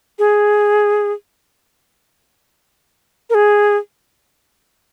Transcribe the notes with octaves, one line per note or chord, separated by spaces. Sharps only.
G#4
A#4
G#4